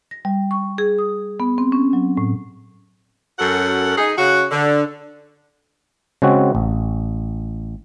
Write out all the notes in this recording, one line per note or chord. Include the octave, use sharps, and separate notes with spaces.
A#6
G3
C#6
G#4
D#6
B3
C4
C#4
F#3
A2
F#2 C#4 F#4 A4 A#4 F#5
D#4 G#4
C#3 F#4
D3
C#3 G#3 C4 F#4
A1